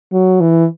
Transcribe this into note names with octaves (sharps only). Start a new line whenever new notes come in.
F#3
E3